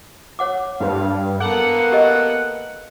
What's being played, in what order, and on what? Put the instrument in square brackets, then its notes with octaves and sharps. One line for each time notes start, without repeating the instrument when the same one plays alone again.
[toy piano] C#5 F#5 D6
[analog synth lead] G2 [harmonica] F5
[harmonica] A#3 B3 A4 [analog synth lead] F#5 [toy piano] B5 D6
[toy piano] G4 A#4 D#5